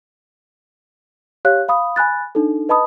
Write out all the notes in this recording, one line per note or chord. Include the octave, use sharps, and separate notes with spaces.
G4 C#5 F5 F#6
F5 B5 D#6
G#5 B5 F#6 A6
D4 D#4 A4
B4 D#5 A5 B5 D#6